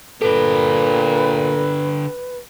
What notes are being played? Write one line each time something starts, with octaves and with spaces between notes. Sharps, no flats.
A#2 D3 G4 A4 B4